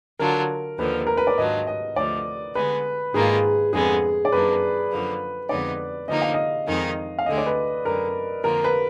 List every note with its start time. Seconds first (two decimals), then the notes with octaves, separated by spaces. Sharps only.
0.19 D3 F#3 D4 F4 A#4
0.79 D#2 D3 F3 B4
1.07 A#4
1.17 B4
1.27 D5
1.37 G#2 D#3 F#3 D4 F4 D#5
1.67 D#5
1.96 D2 D3 F3 D5
2.55 D3 G#3 B3 B4
3.14 G#2 D#3 A#3 F4 G#4
3.73 F2 D3 G#3 B3 G#4
4.25 D5
4.32 F#2 D#3 A#3 D4 B4
4.92 F#2 D3 F3 A#3
5.49 F2 D3 G#3 B3 D#4 D5
6.08 D3 F3 A#3 D#4 D#5
6.22 F5
6.34 D#5
6.67 F2 D#3 G#3 D#4
7.19 F5
7.26 D2 D3 G#3 D#5
7.38 D5
7.46 B4
7.85 F#2 D3 G#3 A#4
8.44 F2 D3 F3 A#3 F4 A#4
8.64 B4